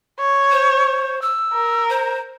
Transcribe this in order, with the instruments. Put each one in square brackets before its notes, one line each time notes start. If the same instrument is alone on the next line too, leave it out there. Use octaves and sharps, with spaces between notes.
[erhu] C#5
[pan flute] C5
E6
[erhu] A#4
[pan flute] C5